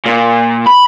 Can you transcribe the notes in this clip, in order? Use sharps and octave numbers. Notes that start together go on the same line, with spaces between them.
A#2
B5